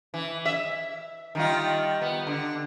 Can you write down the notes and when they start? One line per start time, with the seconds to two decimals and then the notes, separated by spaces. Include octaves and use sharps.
0.14 E3
0.45 E5
1.35 D#3 G3 F4
2.01 B3
2.27 D3